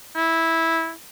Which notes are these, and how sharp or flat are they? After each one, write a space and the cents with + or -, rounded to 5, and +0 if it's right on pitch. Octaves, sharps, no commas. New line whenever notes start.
E4 -10